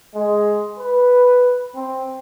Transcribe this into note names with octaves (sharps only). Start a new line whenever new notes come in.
G#3
B4
C4